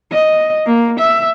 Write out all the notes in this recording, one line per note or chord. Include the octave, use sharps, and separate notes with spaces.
D#5
A#3
E5